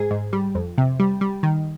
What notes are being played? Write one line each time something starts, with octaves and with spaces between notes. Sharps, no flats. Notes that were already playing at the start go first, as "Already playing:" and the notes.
Already playing: G#2 G#4
G#2
G3
F2
C3
G3
G3
D#3